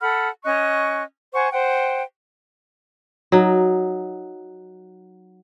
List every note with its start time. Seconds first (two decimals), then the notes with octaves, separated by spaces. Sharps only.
0.02 A4 F#5 B5 F6
0.44 C#4 D#5 C#6 F#6
1.33 C5 F#5 G#5 C#6
1.52 C5 F#5 G5
3.32 F#3 D#4